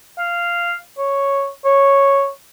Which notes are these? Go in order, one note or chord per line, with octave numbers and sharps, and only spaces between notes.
F5
C#5
C#5